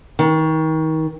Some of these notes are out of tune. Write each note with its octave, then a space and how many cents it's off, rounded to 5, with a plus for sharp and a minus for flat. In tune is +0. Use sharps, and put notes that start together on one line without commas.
D#3 +30